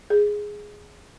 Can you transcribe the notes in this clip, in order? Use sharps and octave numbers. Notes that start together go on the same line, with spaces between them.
G#4